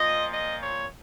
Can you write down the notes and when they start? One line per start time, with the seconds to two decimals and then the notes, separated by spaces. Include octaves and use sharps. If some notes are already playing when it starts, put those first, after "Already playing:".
Already playing: A#2 F3 D#5
0.33 D#5
0.62 C#5